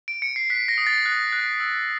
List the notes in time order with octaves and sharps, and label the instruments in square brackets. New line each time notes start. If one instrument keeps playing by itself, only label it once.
[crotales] D7
C#7
C7
F#6 B6
A#6
D#6
A6
F#6
F#6
E6